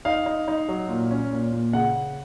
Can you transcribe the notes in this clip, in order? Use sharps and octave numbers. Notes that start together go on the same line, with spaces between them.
D#4 F5
D#4
D#4
F#3
A#2
C#4
A#2
A#2
C#3 F#5